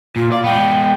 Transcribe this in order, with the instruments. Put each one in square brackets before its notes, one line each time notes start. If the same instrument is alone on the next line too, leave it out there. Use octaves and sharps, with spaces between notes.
[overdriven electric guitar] A#2 [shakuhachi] F4
[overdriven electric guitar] D5 [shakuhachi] F5
[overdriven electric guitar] G#3 B3 [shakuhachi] G5